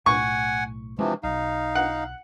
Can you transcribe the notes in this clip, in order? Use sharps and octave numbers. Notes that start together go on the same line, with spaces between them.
B1 A2 F#5 G#5 C#6
C3 E3 F3 G#3 C4 D4
B1 D#4 F5
F#5